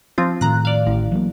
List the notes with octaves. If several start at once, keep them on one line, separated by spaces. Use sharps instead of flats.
F3 C4 F4
A2 D#3 A3 A#5 F#6
D5 F5
A1
E3 F#3 A#3